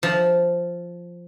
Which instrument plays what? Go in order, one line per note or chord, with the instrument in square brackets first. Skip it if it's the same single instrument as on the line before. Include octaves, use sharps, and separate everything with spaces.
[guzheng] F3